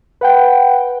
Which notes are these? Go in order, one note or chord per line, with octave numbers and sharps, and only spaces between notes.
B4 F#5 G5